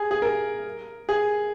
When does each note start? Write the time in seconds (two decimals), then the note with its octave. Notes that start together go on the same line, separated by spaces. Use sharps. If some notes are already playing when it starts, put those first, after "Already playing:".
Already playing: G#4
0.11 G#4
0.22 A#4
1.09 G#4